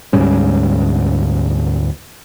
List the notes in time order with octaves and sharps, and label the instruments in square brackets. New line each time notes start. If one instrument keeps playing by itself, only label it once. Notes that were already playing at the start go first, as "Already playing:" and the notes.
[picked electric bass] D2 G#2 G3 C#4